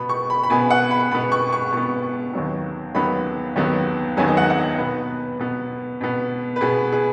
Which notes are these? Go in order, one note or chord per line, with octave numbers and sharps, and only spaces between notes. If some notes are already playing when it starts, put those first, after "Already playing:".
Already playing: B2 B3 B5
C#6
B5
B5
B2 B3 G#5
F#5
B5
B2 B3 B5
C#6
C#6
B2 B3 C#6
D#2 D#3 F#3 B3
D#2 D#3 F#3 B3 B5
D#2 D#3 F#3 B3
D#2 D#3 F#3 B3 G#5
D#5
F#5
F#5
D#5
B2 B3 B4
B2 B3
B2 B3
B4
B2 B3 G#4
G#4